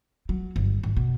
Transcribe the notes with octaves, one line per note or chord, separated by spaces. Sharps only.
F#3
G1
G#1
B2